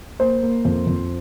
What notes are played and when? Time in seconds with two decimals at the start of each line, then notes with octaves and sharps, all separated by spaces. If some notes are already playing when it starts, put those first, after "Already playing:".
0.19 A#3 C5
0.42 A#3
0.65 F2
0.87 F2